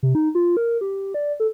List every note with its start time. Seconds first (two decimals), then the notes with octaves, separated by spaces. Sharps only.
0.03 C3
0.15 D#4
0.35 F4
0.57 A#4
0.81 G4
1.14 D5
1.40 A4